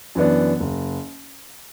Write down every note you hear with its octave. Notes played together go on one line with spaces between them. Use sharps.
F#2 E3 B3 D4
F#1